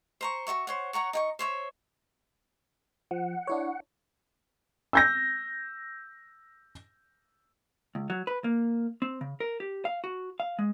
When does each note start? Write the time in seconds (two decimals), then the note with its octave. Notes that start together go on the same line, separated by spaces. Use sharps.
0.21 C5 A#5 C#6
0.47 F#4 A#4 E5 C#6
0.67 C5 C#5 F#5
0.93 C#5 F#5 A#5 C#6
1.13 D#4 G5 C#6
1.39 C5 C#5 E5
3.11 F3 F#5
3.47 D4 E4 C#5
4.93 E6 G6 A#6
7.95 C#2
8.10 F#3
8.27 B4
8.44 A#3
9.02 C4
9.21 C#3
9.40 A#4
9.60 G4
9.85 F5
10.04 F#4
10.40 F5
10.59 G#3